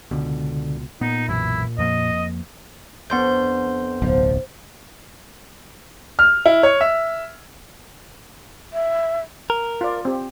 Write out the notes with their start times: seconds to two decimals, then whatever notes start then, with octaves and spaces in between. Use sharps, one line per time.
0.11 C#2 B2 D3
1.01 A#2 B3 D#4
1.28 B1 F#2 E3 E4
1.78 F2 F3 A#3 D#5
3.10 F2 B3 D4 C6 G6
4.02 D1 B1 F3
6.19 F6
6.46 E4
6.63 C#5
6.81 E5
8.73 E5
9.50 A#4
9.81 F4 D5
10.05 C4 G4